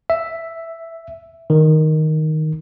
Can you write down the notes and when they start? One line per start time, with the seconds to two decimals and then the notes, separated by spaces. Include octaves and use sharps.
0.10 E5
1.50 D#3